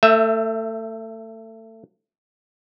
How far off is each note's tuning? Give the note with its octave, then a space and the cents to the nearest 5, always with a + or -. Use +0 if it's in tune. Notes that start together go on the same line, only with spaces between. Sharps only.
A3 +25 E5 +0